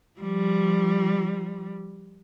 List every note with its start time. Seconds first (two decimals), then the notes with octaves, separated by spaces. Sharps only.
0.19 F3 G3